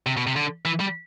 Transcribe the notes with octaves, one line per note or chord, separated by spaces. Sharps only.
C3
B2
C3
D3
E3
G3